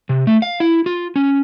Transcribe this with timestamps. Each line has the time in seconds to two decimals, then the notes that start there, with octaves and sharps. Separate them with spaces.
0.09 C3
0.27 A3
0.42 F5
0.60 E4
0.86 F4
1.16 C#4